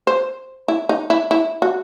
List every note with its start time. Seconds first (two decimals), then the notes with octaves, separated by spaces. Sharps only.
0.07 C5
0.68 E4
0.89 D#4
1.10 E4
1.31 E4
1.62 F#4